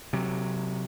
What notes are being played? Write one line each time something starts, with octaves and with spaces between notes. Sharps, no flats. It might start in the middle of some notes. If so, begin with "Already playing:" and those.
C3 F#3